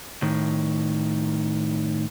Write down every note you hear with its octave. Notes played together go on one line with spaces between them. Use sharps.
A2 D#3